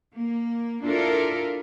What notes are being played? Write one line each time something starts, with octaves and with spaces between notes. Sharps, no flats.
A#3
D4 E4 F4 A4 A#4